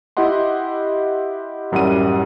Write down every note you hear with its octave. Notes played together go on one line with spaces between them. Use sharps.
E4 G4 D#5 F#5 C6
A1 F#2 G3 E4 F#5 D#7